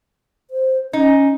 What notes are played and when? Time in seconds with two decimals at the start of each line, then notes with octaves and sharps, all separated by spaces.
0.50 C5
0.93 C#4 D#4